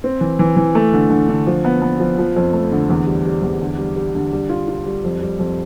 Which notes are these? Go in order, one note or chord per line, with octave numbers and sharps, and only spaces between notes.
C4
E3
E3
E3
A3
D3
D3
D3
F3
B3
B3
F3
F3
F2
A3
D3
E2
G3
G3
E2
D3
G3
G3
D3
G3
F4
F4
G3
F2
G3
F2